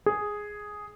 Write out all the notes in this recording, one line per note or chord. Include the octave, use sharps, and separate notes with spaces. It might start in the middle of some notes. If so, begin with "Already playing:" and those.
G#4